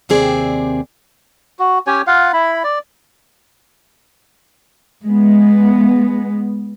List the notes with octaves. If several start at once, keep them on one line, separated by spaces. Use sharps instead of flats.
D#2 C3 C4 G#4 D5
F#4
C#4 G4 C#5 G#5
F4 F5 F#5
E4 B5
D5
G#3 B3